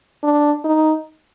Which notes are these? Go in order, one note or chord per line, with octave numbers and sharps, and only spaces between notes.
D4
D#4